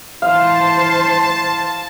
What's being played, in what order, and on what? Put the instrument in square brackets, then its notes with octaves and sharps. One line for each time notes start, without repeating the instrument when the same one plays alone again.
[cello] E3 C5 [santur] F5 [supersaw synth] A5